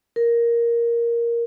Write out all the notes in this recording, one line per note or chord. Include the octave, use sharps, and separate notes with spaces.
A#4